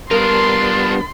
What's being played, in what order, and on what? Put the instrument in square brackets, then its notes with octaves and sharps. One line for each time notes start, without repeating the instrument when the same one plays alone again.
[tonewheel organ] G3 B3 [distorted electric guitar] D4 F4 [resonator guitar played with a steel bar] A#4 [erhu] C6